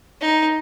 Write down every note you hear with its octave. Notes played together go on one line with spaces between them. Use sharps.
D#4